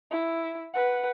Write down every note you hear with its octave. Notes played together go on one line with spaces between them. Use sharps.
E4
B4 F#5